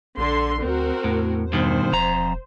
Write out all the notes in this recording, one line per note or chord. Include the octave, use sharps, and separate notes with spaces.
A#1 D3 C6
D2 C4 F#4 A#4
E2 A2
G2 B2 D#3 C5
E1 F2 A#5